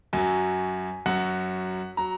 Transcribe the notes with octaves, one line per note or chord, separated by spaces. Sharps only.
F#2 F#3 G#5
F#2 F#3 F#5
F#3 A#5